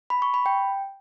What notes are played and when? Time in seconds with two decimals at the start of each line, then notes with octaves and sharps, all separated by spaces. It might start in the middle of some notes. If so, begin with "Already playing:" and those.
0.10 B5
0.22 C#6
0.34 B5
0.46 G5